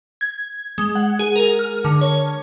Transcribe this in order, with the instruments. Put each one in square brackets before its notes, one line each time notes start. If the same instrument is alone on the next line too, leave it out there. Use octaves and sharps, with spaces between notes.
[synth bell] G#6
G#3
F#5
G#4
A#4
F6
D3
C#5